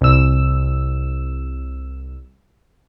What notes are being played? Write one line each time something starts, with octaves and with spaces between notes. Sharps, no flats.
C2 E6